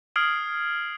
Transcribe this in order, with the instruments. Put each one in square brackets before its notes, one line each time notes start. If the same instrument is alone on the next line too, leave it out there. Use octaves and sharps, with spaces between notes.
[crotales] D#6 F6 G#6 C7 D7 F#7